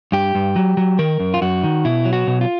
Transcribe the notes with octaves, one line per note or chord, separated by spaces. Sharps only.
G2 G4
G2
F#3
F#3
D#3 A#4
F#2
F4
F#2 F#4
D#3
B2 E4
F#3
F#4
B2
F4